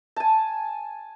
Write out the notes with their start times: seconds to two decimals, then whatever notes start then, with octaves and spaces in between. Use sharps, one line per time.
0.16 G#5 A5